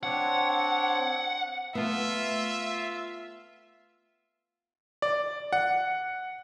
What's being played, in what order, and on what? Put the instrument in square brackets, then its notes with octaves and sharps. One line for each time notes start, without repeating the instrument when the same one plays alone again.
[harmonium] C4 D4 C#5 [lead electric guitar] F#5
[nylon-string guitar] A3 B3 [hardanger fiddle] F4 [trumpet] E5
[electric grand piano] D5
F#5